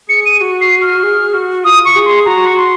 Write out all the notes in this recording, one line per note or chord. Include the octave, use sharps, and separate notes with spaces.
G#4 C#7
D#7
F#4
C7
F6
G#4
F#4
F4 D#6
C#6
G#4
C6
F#4 A#5
C#6
C6